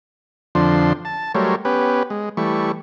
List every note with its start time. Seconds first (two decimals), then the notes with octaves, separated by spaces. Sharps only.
0.55 F2 D3 F3 D4 C6
1.05 A5
1.35 F#3 G3 A3 A#4 C5 C#5
1.65 B3 C#4 G4 B4
2.10 G#3
2.37 E3 G3 A3 C#6